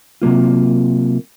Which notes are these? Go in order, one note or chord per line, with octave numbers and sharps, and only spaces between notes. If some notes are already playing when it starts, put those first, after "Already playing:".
C3 F#3 A#3 F4